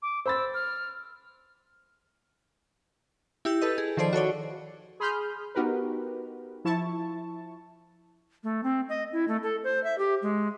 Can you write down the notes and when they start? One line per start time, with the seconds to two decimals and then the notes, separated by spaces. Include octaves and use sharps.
0.02 D6
0.26 C5 B5 E6 A6
0.54 F6
3.45 E4 G4 E6 G6
3.62 A4 B4 D#5
3.78 G#4
3.97 D#3 F3 A4 C5 D5 C7
4.13 F#4 A4 C#5 D5
5.00 G#4 B5 C6 D#6 F6 G6
5.55 B3 D#4 F#4 G4 A#4 B4
6.65 F3 E4 A5 C#6
8.44 A3
8.63 C4
8.89 D#5
9.13 E4
9.28 A3
9.43 A4
9.64 C5
9.84 E5
9.98 G4
10.22 G#3